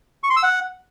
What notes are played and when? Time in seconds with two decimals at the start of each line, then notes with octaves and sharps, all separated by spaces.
0.23 C#6
0.30 C6
0.36 E6
0.43 F#5